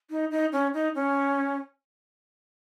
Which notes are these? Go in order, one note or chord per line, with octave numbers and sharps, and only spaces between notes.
D#4
D#4
C#4
D#4
C#4